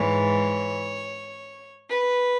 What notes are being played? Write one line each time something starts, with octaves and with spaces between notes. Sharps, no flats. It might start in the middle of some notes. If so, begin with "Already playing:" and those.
Already playing: G#2 E3 C#5
B4